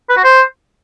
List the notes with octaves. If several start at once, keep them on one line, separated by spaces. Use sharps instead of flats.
B4
F#4
C5